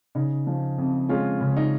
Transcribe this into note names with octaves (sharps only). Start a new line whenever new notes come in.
C#3 D#4
F3
F2
G#3 C#4 F4
C#3
D#4